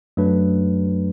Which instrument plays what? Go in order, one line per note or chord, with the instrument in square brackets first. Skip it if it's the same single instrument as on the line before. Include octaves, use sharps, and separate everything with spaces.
[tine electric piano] F#2 F#3 A3 D4 B4